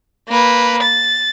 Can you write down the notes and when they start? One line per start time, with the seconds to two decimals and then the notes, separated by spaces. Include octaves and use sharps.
0.29 A#3 B4
0.82 A6